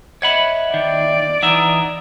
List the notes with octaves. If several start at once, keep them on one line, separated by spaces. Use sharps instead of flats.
C#5 D#5 E5 F#5 B5
D#3 D5
E3 D#4 E5 F#5 A#5 D#6